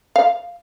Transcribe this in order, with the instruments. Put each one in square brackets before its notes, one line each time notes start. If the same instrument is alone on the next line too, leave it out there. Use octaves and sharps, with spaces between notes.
[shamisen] F5